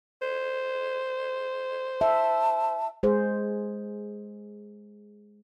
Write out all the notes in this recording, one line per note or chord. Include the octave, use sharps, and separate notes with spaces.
C5
E5 A5
G#3 G#4 C5